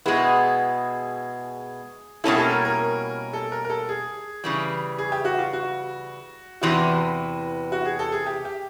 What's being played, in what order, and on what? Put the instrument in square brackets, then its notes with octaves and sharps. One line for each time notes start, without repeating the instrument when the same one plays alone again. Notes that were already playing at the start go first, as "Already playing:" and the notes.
[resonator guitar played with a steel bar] B2 G#3 B3 E4 [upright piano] G#4
[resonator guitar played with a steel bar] B2 G3 A#3 C#4 E4 [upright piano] A4
[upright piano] A4
A#4
A#4
A4
A#4
A#4
A4
G#4
[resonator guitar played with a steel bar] C#3 E3 G3
[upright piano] G#4
G4
F#4
F4
F#4
[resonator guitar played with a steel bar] E2 C3 E3 [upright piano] F#4
[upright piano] F#4
G#4
A4
G#4
G4
G4